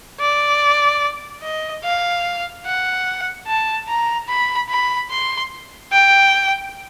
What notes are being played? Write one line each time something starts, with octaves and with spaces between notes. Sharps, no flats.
D5
D#5
F5
F#5
A5
A#5
B5
B5
C6
G5